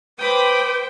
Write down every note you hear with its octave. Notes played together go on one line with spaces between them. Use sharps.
B4 C5 G5 B5 D6 D#6